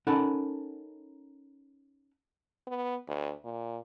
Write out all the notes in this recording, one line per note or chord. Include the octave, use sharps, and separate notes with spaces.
C#4 D#4 A4 A#4 F#5 B5
B3
D2
A#2